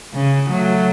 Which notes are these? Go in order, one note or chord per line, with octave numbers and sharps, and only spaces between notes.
C#3
F#3 A3